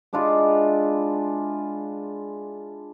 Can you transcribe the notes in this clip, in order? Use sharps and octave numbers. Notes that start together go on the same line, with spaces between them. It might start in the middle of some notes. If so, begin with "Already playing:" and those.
G#3 D4 E4 F4